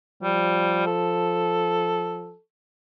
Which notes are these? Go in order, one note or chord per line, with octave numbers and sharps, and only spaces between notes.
F3 G3
A4